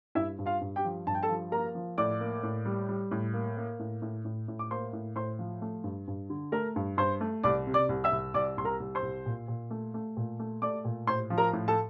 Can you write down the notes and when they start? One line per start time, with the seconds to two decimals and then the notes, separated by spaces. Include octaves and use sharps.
0.15 G2 E4 E5
0.39 G2
0.46 F4 F5
0.61 G2
0.76 G4 G5
0.84 F3
1.07 G2 A5
1.15 G5
1.23 A4 A5
1.29 F3
1.52 A#3 A#4 A#5
1.75 F3
1.98 A2 D5 D6
2.21 A#3
2.43 A2
2.65 G3
2.89 G3
3.11 A2
3.34 A#3
3.57 A#3
3.79 A2
4.02 A2
4.25 A2
4.48 A2
4.59 D6
4.71 A#3 C5 C6
4.93 A2
5.16 A2 C5 C6
5.39 F3
5.62 A3
5.84 G2
6.08 G2
6.30 D3
6.52 A3 A#4 A#5
6.76 G2
6.97 G2 C5 C6
7.21 A3
7.43 C2 D5 D6
7.67 C3
7.74 D5 D6
7.89 C2
8.04 E5 E6
8.12 C2
8.34 C2 D5 D6
8.58 C2 C6
8.65 A#4 A#5
8.80 C2
8.95 C5 C6
9.03 C2
9.26 A#2
9.48 A#2
9.71 A3
9.94 A3
10.17 A#2
10.39 A3
10.62 A3 D5 D6
10.85 A#2
11.07 A2 C5 C6
11.30 F3
11.38 A#4 A#5
11.53 A2
11.68 A4 A5